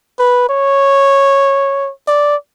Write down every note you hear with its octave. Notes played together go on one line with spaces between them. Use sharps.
B4
C#5
D5